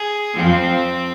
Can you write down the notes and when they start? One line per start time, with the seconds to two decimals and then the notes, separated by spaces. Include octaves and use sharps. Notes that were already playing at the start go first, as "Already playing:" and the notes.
Already playing: G#4
0.36 F2 F3 C4